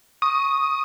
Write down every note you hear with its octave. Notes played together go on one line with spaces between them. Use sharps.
C#6 D#6